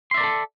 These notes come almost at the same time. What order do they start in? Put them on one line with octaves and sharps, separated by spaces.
C6 E5 D5 A#4 A4